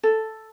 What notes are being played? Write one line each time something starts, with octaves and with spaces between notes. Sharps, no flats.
A4